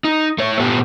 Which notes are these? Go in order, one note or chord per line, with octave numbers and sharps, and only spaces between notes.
D#4
A3 C#5
A#2 B3 G4 A4